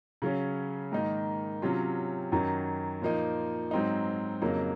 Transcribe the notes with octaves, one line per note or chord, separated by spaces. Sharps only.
C#3 F#3 C#4
G#2 D#3 A#3 D#4
C3 F#3 C#4 F4
F#2 D#3 F#3
A#2 F3 A#3 D#4
G#2 F#3 C4 D#4
F2 C#3 F#3 A#3 D#4